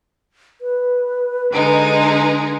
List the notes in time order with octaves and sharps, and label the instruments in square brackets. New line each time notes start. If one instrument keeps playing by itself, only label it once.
[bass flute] B4
[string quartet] D3 G#3 D#4